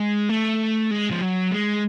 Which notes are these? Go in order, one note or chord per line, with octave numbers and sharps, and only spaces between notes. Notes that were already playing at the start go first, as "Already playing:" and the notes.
Already playing: G#3
A3
G#3
F3
F#3
G#3